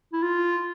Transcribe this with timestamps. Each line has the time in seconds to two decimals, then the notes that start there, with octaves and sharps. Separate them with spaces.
0.13 E4
0.23 F4